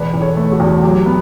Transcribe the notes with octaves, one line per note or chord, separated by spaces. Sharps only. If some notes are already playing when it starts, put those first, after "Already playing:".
Already playing: E1 E2 B4 D5
E2
A4 C#5
A3
F#4 A4
E2
F#4
F#3 G4
B3